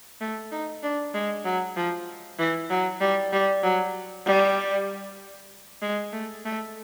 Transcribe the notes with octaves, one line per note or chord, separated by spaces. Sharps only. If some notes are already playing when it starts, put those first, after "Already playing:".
A3
D#4
D4
G#3
F#3
F3
E3
F#3
G3
G3
F#3
G3
G#3
A3
A3